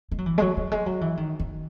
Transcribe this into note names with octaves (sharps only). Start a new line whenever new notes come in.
G#3
F#3
E3
G#3
F#3
F#3
G#3
F#3
E3
D#3
D#3